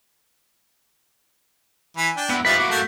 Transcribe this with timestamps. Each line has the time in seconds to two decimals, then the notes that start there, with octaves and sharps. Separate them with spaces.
1.97 E3 G#5 B5
2.17 D4 G5
2.30 B3 E4 E6
2.45 F3 G3 D#4 B4 E5 F5 B6
2.58 A#3 E4 F#4 D6
2.70 A3 A4 A#4 G6